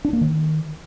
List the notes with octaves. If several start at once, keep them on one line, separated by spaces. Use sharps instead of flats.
D4
A#3
D#3